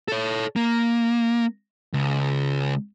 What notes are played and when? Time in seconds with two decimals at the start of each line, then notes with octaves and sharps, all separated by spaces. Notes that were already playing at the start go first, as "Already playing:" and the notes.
0.08 A4 C#5
0.56 A#3
1.93 C#2